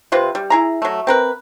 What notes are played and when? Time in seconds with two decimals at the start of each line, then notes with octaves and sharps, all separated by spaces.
0.12 C3 C4 F4 B4
0.35 G3
0.50 E4 G#4 A#5
0.82 F#3 A3
1.07 C4 A#4 B4